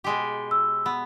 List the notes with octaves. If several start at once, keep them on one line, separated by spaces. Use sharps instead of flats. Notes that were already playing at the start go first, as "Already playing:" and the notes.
B2 G#3 G4
E6
B3